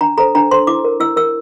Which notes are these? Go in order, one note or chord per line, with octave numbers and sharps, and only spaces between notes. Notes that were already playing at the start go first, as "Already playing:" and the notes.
D4 A#5
A4 C5 A#5
D4 A#5
A4 C5 C6
E4 D6
A#4
E4 E6
A#4 E6